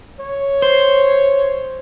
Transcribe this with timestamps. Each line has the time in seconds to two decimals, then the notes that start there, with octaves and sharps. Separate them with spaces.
0.20 C#5
0.62 C5